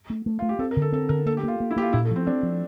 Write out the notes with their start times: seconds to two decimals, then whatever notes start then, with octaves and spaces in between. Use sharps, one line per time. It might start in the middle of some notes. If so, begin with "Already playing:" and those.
0.10 A3
0.26 A3
0.39 A3 F4
0.49 G4
0.59 C4 A4
0.71 A#4
0.76 D3
0.82 A4
0.92 C4 A4
1.09 D3 A#4
1.26 A#3 A4
1.37 G4
1.43 A#3 F4
1.60 A#3
1.71 E4
1.76 A#3 G4
1.82 F4
1.93 A#2 E4
2.05 A3
2.11 F3
2.16 C4
2.27 C4 D4
2.43 F3